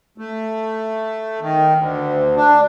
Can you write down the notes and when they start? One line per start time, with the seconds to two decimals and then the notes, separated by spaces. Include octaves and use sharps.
0.18 A3
1.41 D#3
1.76 D2
2.36 D4